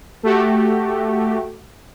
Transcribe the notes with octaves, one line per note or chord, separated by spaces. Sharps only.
A3 F#4 G4